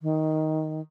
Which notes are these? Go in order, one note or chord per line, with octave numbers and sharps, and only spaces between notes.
D#3